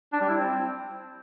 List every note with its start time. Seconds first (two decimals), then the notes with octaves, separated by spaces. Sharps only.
0.13 D4
0.21 G3
0.29 E4
0.37 C4